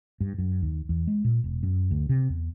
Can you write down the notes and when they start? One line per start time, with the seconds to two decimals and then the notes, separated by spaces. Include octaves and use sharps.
0.21 G2
0.38 F#2
0.62 D#2
0.89 E2
1.07 G#3
1.24 A#2
1.44 E1
1.63 F#2
1.91 D2
2.09 C3
2.29 E2